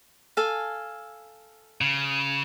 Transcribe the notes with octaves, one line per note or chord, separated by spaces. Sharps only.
A4 F5 G#5
C#3